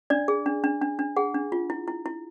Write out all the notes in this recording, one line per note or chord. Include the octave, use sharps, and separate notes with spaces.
D4 D5
G#4
D4
D4
D4
D4
G#4 F#5
D4
F4
E4
E4
E4